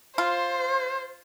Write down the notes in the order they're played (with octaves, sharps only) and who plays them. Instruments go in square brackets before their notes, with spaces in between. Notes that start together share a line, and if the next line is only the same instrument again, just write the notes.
[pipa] F4 [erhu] C5